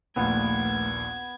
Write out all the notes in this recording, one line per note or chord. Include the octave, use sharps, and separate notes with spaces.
A#1 D#2 A#2 A3 B3 G#6